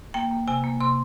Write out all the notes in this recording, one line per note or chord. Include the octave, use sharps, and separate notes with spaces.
A#3 G5
A#3
C3 G#5
A#3
C3 C6